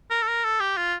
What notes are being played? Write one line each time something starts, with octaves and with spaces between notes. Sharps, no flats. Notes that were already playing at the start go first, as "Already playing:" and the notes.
A#4
A4
A#4
A4
G4
F4